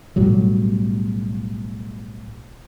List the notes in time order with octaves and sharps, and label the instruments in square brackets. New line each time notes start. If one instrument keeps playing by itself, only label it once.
[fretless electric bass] B1 A2 F#3 G3